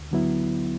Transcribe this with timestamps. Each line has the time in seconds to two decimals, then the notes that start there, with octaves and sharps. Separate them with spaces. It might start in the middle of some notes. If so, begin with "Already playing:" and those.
Already playing: D2
0.11 D3 F#3 B3 E4